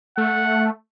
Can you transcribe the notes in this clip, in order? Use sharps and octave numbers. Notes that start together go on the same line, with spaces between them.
A3 F#5